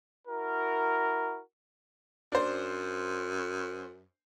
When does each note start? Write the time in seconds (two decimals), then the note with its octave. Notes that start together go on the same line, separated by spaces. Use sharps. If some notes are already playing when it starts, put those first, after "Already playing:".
0.28 E4 F#4 A#4
2.32 F#2 D4 C5